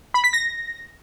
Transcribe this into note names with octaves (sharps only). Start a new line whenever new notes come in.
B5
B6
A#6